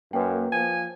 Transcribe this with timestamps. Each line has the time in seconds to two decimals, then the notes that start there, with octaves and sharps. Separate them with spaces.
0.13 F#2 A#3 B4 G5
0.52 F3 G#5